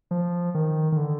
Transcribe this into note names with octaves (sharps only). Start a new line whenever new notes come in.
F3
D#3
D#3
D3